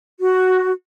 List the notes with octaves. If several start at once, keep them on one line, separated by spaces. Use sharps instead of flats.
F#4